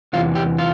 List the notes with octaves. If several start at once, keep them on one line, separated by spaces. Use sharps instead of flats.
E2 C3 E3 F4
G4
F4